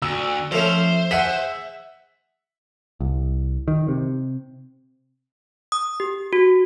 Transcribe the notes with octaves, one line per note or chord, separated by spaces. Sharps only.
D2 E6
F3 A3 C#4 C5
G#4 E5 F#5 B6
C2
D#3
C3
D#6
G4
F#4